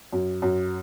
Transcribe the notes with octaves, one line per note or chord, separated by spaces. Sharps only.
F#2
F#2